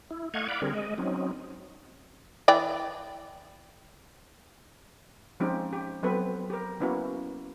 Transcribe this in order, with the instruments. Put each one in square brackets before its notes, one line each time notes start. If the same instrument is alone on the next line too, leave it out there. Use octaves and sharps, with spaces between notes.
[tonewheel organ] E4
A3 D#5 F5 F#5 C#6 G#6
D5 F5 F#5 B5 D6
D3 G3 C4 G#4 A#4
G#3 D#5
F#3 C4 C#4 D#4
[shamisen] E3 D5 G5
[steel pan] F3 G#3 C4 C#4 D#4 G4
G4
F#3 B3 C4 A4 B4
G4 A#4
A#3 B3 C#4 E4 F#4